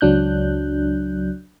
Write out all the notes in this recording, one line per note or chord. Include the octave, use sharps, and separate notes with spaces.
C#2 F#3 D4 F#6 G6